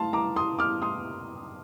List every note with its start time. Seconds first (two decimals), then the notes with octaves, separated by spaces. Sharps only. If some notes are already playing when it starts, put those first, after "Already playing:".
Already playing: F5 A5 C6
0.13 A#5 D6
0.36 C6 D#6
0.59 D6 F6
0.82 C6 D#6